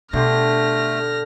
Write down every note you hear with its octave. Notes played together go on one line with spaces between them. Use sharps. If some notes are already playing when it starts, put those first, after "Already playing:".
B2 D3 A3 G4 C6 F6 A#6